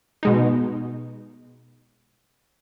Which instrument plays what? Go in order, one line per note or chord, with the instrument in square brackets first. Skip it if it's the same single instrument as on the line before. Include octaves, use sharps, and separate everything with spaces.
[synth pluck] B2 G#3 D#4